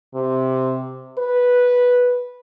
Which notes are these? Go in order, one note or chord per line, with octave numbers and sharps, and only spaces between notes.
C3
B4